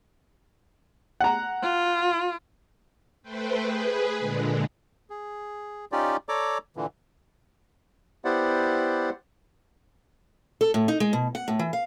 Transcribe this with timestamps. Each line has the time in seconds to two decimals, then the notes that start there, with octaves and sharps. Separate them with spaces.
1.21 F#5 A#5
1.62 F4
3.23 A3 B4 C5 G5
3.61 G#4 B4
4.17 A#2 D3 G#3
5.10 G#4
5.92 C#4 D#4 F4 G4 D5
6.29 A4 C#5 D5 A#5 D6
6.76 A#2 D3 E3
8.25 B3 E4 G4 C5 D5 F#5
10.61 A4
10.74 A2
10.88 D#4
11.00 G#3
11.13 B2
11.35 F#5
11.48 A2
11.59 E3
11.73 F5